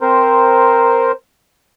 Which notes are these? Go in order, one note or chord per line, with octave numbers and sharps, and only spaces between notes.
C4 A#4 C5